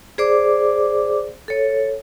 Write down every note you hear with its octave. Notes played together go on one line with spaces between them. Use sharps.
G#4 C5 D5 D6
A4 C#5